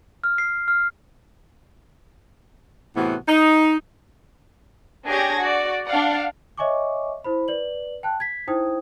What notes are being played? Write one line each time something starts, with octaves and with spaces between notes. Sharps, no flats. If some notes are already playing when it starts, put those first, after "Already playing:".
F6
C7
F6
A2 C3 E3 B3 F#4
D#4
D4 G4 G#4 C#5 G#6 A#6
F#4 D5
D4 D5 F5 F#5
C#5 D#5 E5 G#5 C#6 D6
E4 C5 B5
B4 D5 F#7
G5 A5 F#6
G#6 B6
D#4 E4 C5 G5 D#6 G#6